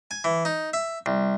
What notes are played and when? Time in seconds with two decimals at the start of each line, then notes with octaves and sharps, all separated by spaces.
0.11 G#5
0.24 E3
0.45 D#4
0.73 E5
1.06 C2